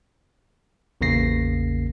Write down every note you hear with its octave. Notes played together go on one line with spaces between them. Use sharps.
A1 E2 C#3 A#3 A#6 C7